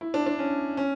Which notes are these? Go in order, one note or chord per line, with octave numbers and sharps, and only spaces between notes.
E4
D4
D4
C#4
C#4